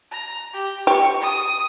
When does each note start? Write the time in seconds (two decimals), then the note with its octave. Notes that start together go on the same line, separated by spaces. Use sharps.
0.11 A#5
0.54 G4
0.87 G4 C#6
1.22 D#6